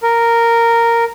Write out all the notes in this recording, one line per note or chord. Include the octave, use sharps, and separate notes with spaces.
A#4